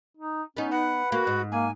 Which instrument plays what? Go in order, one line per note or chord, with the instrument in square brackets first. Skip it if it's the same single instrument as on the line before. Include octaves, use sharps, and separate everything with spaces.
[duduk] D#4
[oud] B3 D#4 [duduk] C#4
[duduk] B4 [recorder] F#5
[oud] A#3 [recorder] F#4
[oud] G#2
[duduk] A#3 [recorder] G#5